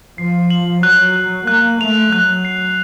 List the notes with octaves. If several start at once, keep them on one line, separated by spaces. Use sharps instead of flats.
F3 C7
F#7
F#3 F#6
F#6
A#3 F#6
A3 F7
F#3 F#6
C7